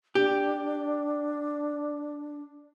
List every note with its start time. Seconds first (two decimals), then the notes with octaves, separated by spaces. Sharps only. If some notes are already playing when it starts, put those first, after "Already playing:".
0.15 D4 G4